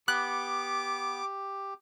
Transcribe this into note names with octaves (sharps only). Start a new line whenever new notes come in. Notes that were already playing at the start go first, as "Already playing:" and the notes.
B3 G4 D6 F#6